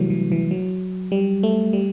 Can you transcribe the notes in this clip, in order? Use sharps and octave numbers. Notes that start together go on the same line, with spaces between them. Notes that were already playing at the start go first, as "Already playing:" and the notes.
Already playing: C3 E3 F#3 G3 A3
E3
E3
F#3
G3
A3
G3